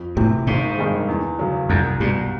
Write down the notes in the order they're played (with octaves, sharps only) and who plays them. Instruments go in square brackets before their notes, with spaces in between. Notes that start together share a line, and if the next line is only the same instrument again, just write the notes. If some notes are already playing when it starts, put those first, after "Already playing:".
Already playing: [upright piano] F2
[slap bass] A2 [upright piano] C3 E3
[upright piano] G#1 [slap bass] G#2
[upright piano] G2 D#3 G#3
E2
C#3 F#3
[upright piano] C2 [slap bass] F2
[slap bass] G2 [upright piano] B2 G3